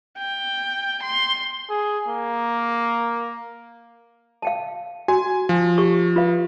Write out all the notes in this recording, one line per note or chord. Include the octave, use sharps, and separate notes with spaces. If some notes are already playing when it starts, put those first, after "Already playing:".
G5
C6
G#4
A#3
F5 G5 A5
F#4 G#5
F3
G4 C#6
F4 B4 F5